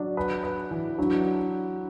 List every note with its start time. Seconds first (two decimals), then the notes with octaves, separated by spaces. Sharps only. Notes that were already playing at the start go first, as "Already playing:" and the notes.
Already playing: F#3 D4
0.17 B4
0.44 B4
0.71 E3
0.98 F#3 D4